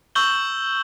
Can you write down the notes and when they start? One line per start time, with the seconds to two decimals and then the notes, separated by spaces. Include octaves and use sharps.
0.15 C#6 E6 G6 F#7 G7